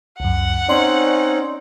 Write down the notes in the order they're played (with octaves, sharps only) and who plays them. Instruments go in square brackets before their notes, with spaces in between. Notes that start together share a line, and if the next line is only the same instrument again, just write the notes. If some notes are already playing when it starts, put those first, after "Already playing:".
[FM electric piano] C#2 F#2 [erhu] F#5
[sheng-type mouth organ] C4 C#4 D#4 [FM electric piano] D5 C6